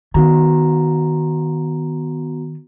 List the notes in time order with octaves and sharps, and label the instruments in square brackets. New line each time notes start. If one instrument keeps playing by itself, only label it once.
[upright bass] D#3 [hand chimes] B3 F#4 A#5